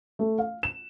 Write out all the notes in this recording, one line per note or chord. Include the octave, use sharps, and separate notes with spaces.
A3
F5
E7